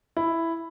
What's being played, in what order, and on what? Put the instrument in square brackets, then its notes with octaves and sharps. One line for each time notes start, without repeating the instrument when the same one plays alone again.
[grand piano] E4